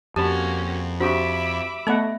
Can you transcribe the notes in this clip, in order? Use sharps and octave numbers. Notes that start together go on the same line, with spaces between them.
F2 A#3 C#4 F#4 G4 A5 B5
C4 D4 F#4 G4 C5 E5 B5 D6
A3 B3 D#5 F#5 B5